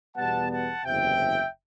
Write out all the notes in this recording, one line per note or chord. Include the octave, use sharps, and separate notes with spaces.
E2 B2 G3 B3 F#5 A5
F#5 A5
F#1 E2 C3 E5 G5